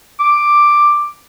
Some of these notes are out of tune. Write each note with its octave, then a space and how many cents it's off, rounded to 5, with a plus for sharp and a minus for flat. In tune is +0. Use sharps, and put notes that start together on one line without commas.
D6 +5